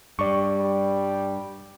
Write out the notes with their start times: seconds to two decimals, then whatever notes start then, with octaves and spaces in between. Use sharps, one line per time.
0.19 G2 G4 D5 C#6
0.58 G3